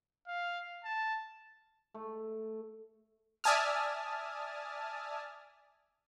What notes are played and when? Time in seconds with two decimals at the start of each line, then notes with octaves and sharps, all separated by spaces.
0.27 F5
0.84 A5
1.94 A3
3.44 D5 E5 G#5 A5 D#6 F6